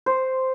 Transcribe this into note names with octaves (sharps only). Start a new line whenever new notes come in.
C5